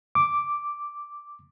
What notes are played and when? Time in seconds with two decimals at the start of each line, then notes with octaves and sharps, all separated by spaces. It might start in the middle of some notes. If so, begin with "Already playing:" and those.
0.15 D6